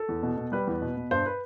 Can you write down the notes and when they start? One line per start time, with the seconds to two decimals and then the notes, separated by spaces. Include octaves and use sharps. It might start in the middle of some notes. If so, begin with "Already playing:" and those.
Already playing: A4
0.09 E2
0.23 B2
0.37 B2
0.52 G3 B4
0.67 E2
0.82 B2
0.97 B2
1.11 G2 C5
1.26 B4